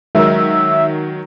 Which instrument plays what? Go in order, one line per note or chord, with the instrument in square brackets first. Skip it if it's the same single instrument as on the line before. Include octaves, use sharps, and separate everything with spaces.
[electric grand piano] D#3 F#3 [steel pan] G#3 A#4 [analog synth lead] E5